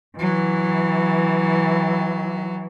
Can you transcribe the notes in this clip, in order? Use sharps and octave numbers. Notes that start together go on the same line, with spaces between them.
E3 F#3